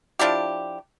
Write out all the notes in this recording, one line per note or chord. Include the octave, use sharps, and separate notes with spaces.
F3 D4 E4 G4